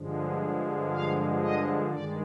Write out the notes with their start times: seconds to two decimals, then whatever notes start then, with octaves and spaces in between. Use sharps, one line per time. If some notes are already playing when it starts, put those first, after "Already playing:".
Already playing: G2 D3 F3 G#3
0.89 F5
1.39 D#5
1.89 G2 D#3 G#3 D5